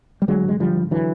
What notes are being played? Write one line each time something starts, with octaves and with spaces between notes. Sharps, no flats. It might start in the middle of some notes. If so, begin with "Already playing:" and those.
G3
D3 F#3 G#3
G#1 G#3
D3 F3 G3
G#1
D3 E3 F#3